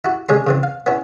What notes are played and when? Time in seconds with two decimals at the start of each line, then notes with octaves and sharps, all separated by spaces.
0.05 E4 F#4
0.29 C3 G#3 C#4 G#4 A4 C6
0.47 C#3 E3 C4
0.63 F5
0.86 B3 C#4 E4